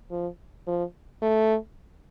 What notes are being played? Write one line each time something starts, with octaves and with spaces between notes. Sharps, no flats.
F3
F3
A3